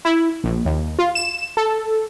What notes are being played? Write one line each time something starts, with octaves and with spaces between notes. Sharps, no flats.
E4
A#1
D#2
F4
E7
A4